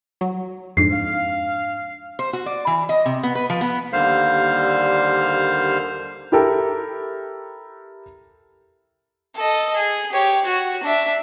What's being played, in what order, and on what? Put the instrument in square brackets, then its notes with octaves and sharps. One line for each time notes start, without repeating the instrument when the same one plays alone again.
[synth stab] F#3
[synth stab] F2 G#2 [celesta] D4 C7
[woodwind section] F5
[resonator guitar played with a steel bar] C5
F#4
D5
E3
D#5
C3
B3
B4
F3
B3
[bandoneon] D#2 D3 G3 A#3 C5 F5
[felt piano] E4 G4 A4 A#4
[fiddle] A4 D#5
G#4
G4 C#5
F#4
D4 E5